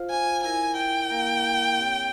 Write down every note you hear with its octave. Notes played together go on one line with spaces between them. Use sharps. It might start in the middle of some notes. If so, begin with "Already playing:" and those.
Already playing: F4 C5 F5
G#5
E4 A#4 E5 G#5
G5
A#3 E4 A#4 F5
C4 G4 C#5